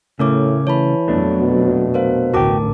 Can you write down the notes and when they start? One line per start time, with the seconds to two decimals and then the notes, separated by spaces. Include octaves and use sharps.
0.19 A2 C#3 A3 C#4 A#4 C#5 D6
0.67 E3 C#5 A5 B5
1.08 F2 A#2 F#3 A3 B3 D4
1.40 B2
1.94 A#4 C5 F5
2.34 A1 D2 F#4 A#4 G5 A5 D6